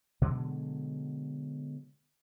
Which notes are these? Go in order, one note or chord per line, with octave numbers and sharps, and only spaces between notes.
B2 D3 F#3 G#3